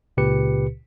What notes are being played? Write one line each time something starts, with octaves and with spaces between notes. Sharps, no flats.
C#2 A#2 C#3 G4 B4 C#7